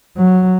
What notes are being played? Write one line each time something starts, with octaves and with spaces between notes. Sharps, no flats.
F#3